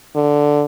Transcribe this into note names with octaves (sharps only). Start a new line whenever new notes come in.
D3